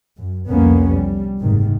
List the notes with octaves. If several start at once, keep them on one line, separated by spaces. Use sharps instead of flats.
F#2
C2 F2 A#3 B3 C#4
G3
F#1 G#2 C3 D#3